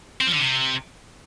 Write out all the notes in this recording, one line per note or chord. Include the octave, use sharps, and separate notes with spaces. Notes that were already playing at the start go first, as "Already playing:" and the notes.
C4
F3
D3
C3